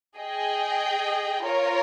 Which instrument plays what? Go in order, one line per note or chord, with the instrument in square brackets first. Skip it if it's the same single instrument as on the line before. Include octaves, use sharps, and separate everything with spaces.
[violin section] G#4 D#5 G5
F4 A#4 C#5